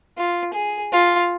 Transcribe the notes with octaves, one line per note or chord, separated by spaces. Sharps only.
F4
G#4
F4